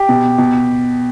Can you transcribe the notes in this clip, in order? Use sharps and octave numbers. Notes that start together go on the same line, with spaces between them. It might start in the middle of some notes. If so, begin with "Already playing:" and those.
Already playing: G4
B2
B2